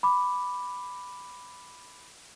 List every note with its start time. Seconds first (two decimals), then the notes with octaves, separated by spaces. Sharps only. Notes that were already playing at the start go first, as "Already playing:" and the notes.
0.03 B5 D6